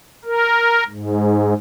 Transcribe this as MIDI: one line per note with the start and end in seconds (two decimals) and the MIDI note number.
0.25 0.84 70
0.89 1.54 44